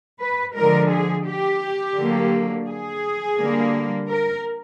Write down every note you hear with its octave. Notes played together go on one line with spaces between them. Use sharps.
B4
D3 F3 G#3 A#4
G#4
G4
D3 F#3 A#3
G#4
D3 G3 A#3
A#4